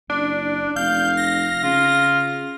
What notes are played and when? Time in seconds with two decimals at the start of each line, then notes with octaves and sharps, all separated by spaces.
0.10 F#1 D4
0.76 F1 F5 G6
1.17 A#6
1.63 C#3 F4